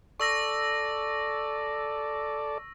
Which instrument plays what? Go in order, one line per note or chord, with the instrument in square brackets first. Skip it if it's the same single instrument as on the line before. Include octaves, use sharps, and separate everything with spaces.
[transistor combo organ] A4 D5 [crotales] C#6 E6 A#6